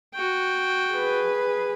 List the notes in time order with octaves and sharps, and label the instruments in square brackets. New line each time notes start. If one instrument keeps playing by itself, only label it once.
[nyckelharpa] F#4 G5
[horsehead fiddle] G#4 B4